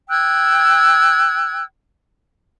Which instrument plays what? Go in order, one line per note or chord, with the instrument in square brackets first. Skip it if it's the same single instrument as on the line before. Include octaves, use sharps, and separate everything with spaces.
[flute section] G5 E6 F#6 G#6